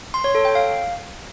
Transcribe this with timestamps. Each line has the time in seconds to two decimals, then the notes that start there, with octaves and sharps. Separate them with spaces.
0.14 C6
0.24 C#5
0.35 A4
0.45 G5
0.55 F5